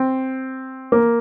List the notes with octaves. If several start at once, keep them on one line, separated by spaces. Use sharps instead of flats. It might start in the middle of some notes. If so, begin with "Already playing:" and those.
Already playing: C4
A#3